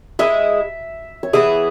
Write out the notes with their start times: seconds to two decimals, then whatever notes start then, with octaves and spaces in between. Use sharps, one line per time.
0.19 G#3 E4 G#4 E5
1.23 C#5
1.33 E3 B3 E4 G#4 E5